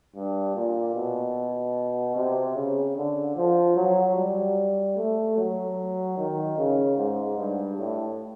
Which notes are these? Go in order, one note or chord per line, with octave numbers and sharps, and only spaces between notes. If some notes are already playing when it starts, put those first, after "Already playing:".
G2
A#2
B2
C3
C#3
D3
F3
F#3
G3
A3
F#3
D#3
C#3
G#2
G2
A2